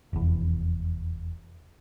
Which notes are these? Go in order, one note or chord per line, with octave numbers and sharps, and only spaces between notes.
F1 E2